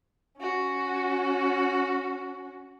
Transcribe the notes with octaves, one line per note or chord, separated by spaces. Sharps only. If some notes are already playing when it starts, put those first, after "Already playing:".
C#4 F#4